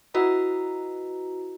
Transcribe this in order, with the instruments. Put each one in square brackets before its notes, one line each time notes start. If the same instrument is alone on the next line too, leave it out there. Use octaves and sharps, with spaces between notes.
[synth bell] E4 F#4 B4 D#5 A#5